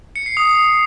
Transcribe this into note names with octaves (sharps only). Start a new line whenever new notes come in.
C#7
C7
D#6